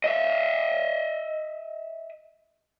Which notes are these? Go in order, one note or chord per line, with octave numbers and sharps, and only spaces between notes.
D#5 E5